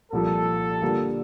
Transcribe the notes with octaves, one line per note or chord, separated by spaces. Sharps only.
C2 A#2 F3 A#3 A4
D3 G3 A#3 F4